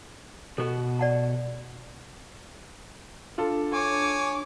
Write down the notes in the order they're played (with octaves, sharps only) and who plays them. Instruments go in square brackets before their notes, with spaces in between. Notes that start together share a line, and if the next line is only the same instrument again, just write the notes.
[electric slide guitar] B2 F#4 [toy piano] A4
[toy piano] D5 F#5 A5
[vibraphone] D4 [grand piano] F4 A4
[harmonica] C#5 G#5 [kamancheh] D6